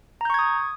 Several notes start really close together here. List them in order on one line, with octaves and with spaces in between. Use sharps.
A#5 G6 C#6 G#6 D#6